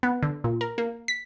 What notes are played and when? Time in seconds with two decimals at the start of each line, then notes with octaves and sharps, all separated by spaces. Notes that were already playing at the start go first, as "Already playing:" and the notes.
0.03 B3
0.23 D3
0.44 A#2
0.61 A#4
0.78 A#3
1.08 B6